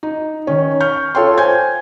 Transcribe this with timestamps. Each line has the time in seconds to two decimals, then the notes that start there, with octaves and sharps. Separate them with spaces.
0.03 D#4
0.47 D#3 C#4
0.81 C#6 F6 G6
1.15 F4 A4 C#5 G5 C6
1.38 C5 G#5 G6 G#6